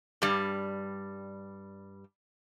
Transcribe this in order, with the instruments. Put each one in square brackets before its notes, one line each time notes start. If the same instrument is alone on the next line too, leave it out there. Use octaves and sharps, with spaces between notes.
[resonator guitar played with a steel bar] G2 G3